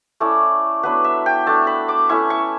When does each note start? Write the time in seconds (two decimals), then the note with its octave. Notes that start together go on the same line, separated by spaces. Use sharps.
0.20 A3 C#4 E4 D5
0.83 F#3 B3 D4 B4
1.04 E5
1.26 G5
1.46 A3 D4 A5
1.67 B5
1.89 D6
2.09 A3 C#4 E4 C#6
2.30 C#6